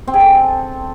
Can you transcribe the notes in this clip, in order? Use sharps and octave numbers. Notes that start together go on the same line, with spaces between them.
C4
G#4
A4